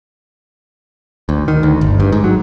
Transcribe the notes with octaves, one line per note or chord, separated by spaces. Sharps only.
D2
D#3
D2
G1
G2
G#2
F#3